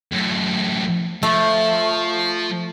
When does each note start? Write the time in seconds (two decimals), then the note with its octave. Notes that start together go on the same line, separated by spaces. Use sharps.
0.12 F#2 A2
1.23 F3 A3